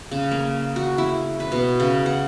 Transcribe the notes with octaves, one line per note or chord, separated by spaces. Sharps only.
C#3
A#3
F#4
E4
B4
B2
C#3
F#5